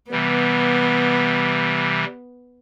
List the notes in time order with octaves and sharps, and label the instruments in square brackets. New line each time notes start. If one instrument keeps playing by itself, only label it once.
[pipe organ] C3 E3 G3 [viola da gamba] B3